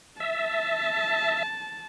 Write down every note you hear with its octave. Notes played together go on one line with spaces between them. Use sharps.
E5 A5